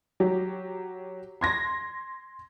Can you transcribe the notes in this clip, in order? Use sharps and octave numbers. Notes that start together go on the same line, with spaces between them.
F#3 G4
C6 G#6 A#6